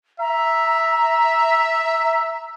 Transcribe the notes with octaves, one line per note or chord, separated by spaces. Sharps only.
E5 A#5